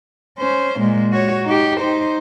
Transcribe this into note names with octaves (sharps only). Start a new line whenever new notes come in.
C#4 C5
A#2 G#3
F#4 C#5
D#4 G4
D#4 C5